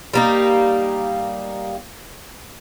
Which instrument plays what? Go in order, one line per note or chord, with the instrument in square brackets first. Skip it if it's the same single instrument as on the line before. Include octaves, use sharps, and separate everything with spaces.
[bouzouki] G3 A#3 D#4